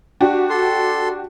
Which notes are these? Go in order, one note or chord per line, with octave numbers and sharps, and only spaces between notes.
D4 F#4 G4
A4 C6